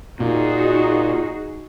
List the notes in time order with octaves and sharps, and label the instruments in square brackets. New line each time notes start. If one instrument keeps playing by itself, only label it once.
[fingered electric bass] A#2 [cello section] D#4 F#4 G#4